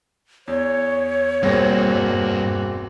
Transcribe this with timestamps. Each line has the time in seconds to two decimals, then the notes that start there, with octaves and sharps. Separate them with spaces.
0.48 E2 C#5
1.43 E1 G2 A#3 C4 F#4 A#6